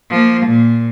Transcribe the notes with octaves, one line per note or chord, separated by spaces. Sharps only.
F3 A#3
A#2